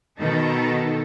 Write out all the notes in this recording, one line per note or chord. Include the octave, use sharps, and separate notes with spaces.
B2 D#3 D#4 A4